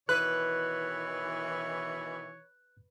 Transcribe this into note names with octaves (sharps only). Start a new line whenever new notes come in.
B2 D#3 E3 B4 C#5 F#6